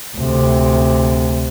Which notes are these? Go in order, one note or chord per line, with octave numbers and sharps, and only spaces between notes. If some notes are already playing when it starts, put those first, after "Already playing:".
D2 C3